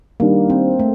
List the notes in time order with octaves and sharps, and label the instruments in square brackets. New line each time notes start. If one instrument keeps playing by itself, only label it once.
[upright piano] D#3 G3 D4 [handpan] A#3
[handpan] C4
A3